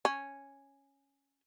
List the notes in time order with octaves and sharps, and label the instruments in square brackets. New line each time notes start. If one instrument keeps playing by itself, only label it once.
[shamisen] C#4